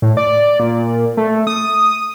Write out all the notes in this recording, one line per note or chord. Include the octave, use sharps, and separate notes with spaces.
A2
D5
A#2
A3
D#6